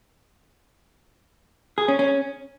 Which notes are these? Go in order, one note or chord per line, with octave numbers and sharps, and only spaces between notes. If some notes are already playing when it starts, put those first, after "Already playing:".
G#4
C#4
C#4